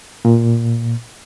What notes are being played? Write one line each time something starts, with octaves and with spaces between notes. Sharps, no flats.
A#2